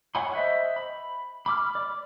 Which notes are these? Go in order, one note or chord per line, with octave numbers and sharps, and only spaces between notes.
C#5 F#5 G#5 B5 C6
C5 D#5 E5 F#5
B5
B5 D6 E6 F6
D5